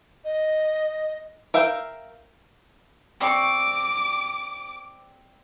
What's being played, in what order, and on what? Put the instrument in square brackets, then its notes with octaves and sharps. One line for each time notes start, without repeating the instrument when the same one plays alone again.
[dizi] D#5
[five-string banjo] A#4 E5 F5 G5
[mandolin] C4 D5 C#6 [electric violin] D6